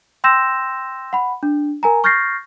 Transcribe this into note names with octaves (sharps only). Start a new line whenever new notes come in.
G5 C6 E6 G6 A#6 E7
F#5 B5
D4
A#4 G#5 A#5
C#6 F6 G6 A6 A#6 C7